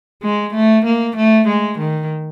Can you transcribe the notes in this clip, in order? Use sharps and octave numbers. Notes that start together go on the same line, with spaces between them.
G#3
A3
A#3
A3
G#3
D#3